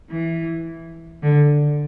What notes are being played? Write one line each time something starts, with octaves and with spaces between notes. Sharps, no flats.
E3
D3